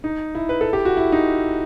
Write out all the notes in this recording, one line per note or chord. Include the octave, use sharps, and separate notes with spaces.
D#4
E4
B4
A4
G4
F#4
E4
D#4